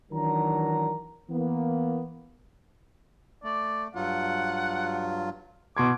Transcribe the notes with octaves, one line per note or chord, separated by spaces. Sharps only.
D#3 E3 F#3 D4 A#4 A#5
E3 A#3 B3
A3 D5
G2 F#3 F4 F#5
B2 C6 D6 G#6